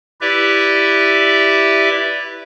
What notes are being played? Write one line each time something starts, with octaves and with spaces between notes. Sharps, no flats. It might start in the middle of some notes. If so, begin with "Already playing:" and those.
E4 G4 B4 D5 E5